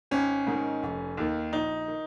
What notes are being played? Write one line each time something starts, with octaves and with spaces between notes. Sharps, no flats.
G#1 C#4
G#2 D#3
F1
D#2 D#3
A#1 D#4
D#3